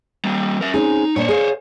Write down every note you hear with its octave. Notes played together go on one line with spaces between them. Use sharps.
G3 A#3
A#4 E5
C4 C#4 D#4 G#4
A#2 D4 C5 C#5
G#4 F5